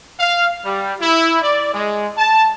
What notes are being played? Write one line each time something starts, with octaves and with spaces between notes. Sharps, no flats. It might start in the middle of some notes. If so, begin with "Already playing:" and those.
F5
G3
E4
D5
G#3
A5